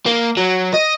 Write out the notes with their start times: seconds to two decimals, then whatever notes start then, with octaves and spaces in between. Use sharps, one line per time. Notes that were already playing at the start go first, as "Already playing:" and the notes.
0.06 A#3
0.37 F#3
0.74 D#5